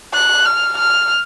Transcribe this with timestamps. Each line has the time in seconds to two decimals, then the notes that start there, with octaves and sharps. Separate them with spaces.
0.14 F#6
0.45 F6
0.78 F6